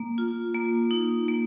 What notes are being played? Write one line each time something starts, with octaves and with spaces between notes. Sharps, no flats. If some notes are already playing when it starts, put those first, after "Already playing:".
Already playing: A#3
F4
A#3
D#4
A#3